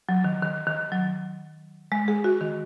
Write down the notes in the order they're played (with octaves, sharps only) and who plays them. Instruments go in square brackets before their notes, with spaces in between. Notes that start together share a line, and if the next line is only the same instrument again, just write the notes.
[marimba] F#3
D#3
D#3
D#3
F#3
G#3
G#4
F#4
D#3